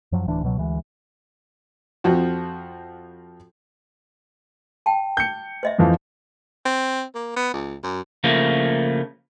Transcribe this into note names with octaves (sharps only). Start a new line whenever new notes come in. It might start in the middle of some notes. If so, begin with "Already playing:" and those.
F#2 F3 F#3
D1 D2 E3 D4
C#2 B2 F#3
D2 E3 G#3
F2 F3 F#4
G5 A5
G6 C#7
C5 D#5 E5
F2 E3 F3
C4
A#3
B3
C#2
F#2
C#3 F3 A3 A#3